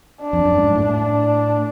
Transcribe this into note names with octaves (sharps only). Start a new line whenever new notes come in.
D4
F2
F#2
G#2
A2
D4